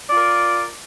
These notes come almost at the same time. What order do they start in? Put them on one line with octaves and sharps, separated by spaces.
D5 F4 A#4